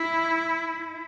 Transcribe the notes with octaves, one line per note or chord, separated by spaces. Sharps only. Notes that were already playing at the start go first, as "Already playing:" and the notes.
Already playing: E4